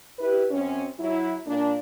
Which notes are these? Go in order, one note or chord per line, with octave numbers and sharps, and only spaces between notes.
E4 G4 B4
F#2 C4 C#4
F#3 E4
A#2 A#3 D4